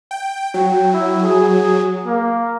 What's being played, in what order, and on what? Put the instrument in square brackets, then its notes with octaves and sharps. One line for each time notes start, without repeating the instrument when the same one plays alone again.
[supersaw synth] G5
[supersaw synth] F#3 [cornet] G5
[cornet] E4
G#4
A#3